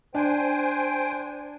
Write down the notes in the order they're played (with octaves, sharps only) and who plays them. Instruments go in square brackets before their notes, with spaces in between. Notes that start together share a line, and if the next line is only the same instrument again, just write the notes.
[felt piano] D4 [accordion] C5 G5 G#5